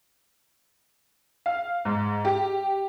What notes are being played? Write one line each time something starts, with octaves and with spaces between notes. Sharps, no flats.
F5
G#2
G4